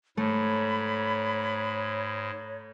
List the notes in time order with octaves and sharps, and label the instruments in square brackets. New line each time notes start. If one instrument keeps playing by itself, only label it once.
[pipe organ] G#2 [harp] A3 [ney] C#5 [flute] B5